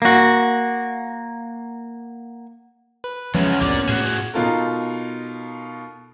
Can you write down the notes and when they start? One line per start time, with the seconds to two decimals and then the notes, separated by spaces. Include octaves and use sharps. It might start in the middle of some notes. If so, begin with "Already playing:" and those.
0.02 A#3 F#4
3.04 B4
3.34 E2 C#3 F3 G#3 B3 C#4
3.61 A1 D2 G2 A#3 D5
3.89 A2 F#4 G#4
4.34 B2 D#4 F4 A4 A#4